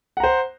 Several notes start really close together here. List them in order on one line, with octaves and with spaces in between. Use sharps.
F#5 A#5 C5